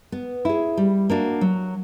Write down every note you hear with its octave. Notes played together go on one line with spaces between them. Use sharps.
B3
E4 G#4
G3
A#3 D4 F#4
F#3